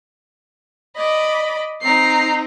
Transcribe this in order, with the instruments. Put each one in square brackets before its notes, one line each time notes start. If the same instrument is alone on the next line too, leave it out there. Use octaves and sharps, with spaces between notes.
[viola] D5 [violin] D#5 B5
[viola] C4 D#4 [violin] A#5 C7